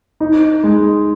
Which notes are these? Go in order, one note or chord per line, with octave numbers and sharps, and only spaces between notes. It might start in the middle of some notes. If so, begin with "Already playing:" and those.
D#4
G#3